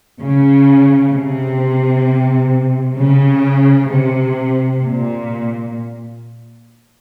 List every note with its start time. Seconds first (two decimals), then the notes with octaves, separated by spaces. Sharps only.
0.19 C#3
1.11 C3
2.97 C#3
3.89 C3
4.81 A#2